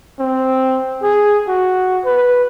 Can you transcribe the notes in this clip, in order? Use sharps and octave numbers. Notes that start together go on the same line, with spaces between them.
C4
G#4
F#4
B4